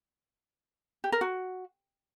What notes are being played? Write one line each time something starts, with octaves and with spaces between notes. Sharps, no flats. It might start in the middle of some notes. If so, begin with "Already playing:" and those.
G4
A#4
F#4